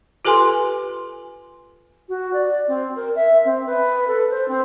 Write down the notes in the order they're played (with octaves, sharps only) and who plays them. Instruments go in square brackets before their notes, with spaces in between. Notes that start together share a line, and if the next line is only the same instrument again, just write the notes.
[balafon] F4 G4 A4 B4 G#5 C6
[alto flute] F#4
D5
C4
A#4
E5
C4
B4
A4
C5
C4